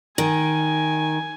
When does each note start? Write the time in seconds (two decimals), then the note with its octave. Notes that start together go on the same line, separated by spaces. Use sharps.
0.18 D#3 G#5